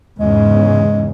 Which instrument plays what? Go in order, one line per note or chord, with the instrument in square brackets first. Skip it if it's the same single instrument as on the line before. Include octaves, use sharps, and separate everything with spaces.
[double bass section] E2 G#2 C#3 [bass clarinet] G#3